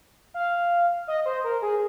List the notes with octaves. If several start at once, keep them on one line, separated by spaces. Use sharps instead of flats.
F5
D#5
C5
A#4
G#4